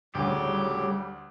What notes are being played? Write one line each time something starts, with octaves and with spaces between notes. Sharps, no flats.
D2 A2 C#3 F#3 G3 G4